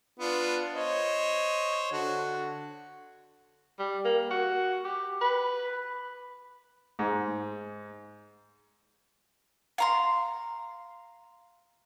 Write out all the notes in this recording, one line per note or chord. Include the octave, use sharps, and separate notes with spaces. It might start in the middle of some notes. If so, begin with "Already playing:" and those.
B3 D4 F4
C5 C#5 D#5
D3 F#4
G3
A#3
F#4
G4
B4
G#2
F5 A#5 C6